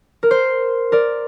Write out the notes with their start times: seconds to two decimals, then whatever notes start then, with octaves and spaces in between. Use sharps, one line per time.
0.23 A#4
0.31 C5
0.92 A#4 D5